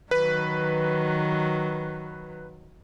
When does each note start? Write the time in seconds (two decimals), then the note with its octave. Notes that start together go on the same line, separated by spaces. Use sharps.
0.11 D#3 F#3 B4